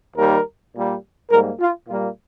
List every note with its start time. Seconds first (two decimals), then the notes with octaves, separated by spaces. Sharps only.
0.17 D#2 D#3 G3 A#3 A#4
0.74 A#2 G3 A#3
1.31 G#2 G3 A#3 A#4
1.59 F4
1.88 A#2 G3 A#3 F4